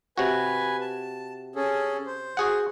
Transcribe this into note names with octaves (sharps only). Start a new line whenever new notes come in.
C3 F#4 B4 G#5
A5
C#4 G#4 A4
C5
F#4 G#4 F#5